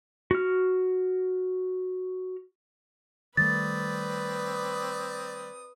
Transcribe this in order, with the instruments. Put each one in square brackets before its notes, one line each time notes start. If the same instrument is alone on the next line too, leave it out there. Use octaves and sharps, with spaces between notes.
[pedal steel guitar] F#4 F6
[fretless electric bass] D#3 G3 A3 [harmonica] C4 D5 D#6 [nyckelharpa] B4 [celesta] A6